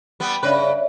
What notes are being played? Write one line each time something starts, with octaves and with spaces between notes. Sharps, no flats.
G3 B3
G2 C#3 B4 C#5 D5 E5